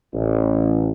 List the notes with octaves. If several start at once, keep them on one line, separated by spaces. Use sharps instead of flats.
A1